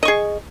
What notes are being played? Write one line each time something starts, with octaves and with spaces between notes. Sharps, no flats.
G#4 D#5 C#6